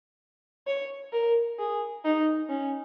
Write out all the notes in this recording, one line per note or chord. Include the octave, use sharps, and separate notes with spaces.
C#5
A#4
G#4
D#4
C#4